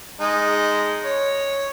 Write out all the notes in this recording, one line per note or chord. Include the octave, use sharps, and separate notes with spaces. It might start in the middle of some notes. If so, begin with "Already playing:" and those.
G#3 D#4 A5
C#5